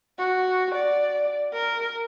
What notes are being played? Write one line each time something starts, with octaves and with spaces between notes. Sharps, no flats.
F#4
D5
A#4